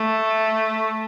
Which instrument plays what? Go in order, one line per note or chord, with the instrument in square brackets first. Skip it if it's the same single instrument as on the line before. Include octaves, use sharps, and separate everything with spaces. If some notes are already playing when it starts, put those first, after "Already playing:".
Already playing: [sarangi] A3